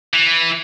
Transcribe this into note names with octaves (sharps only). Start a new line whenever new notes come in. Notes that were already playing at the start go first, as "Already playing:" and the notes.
E3